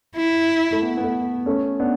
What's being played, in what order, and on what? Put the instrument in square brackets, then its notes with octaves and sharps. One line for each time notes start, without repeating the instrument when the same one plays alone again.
[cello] E4
[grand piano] A3
B3
B3
A3
A3 C#4
B3 D4